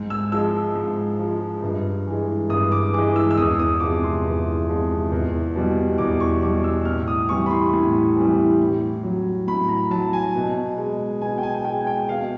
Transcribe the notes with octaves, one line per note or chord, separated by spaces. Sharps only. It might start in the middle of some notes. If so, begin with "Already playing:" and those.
Already playing: G#2
E6
F3 G#3 E6
G#2
F3 G#3
G2
E3 G#3
G2 D#6
D6
E3 G#3 D6
E6
E6
E2 D#6
D#6
C3 F3 G#3 D6
C6
E2
C3 F3 G#3
E2
B2 G3
E2 D6
C#6
B2 G3 D6
E6
A2 F6
D#6
E3 G3 C#6
B5
C6
A2
E3 G3
A2
F#3
A2 B5
A#5
F#3 A5
G#5
B2
G#3
B2 G#5
G5
G#5
G#5
G#3 G5
G#5
G5
B2 F5